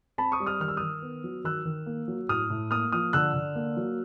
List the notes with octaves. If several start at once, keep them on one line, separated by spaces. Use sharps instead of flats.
C4 A5 B5
C#6 D#6
G3
D#6 F6
D#3 F6
E6
D#3 D#6 F6
B3
F#3
D#3 E6 F#6
D#3
A#3
F#3
A2 D#6 F6
A2
A#3 D#6 F6
F3 D#6 F6
D3 E6 F#6
D3
A#3
F#3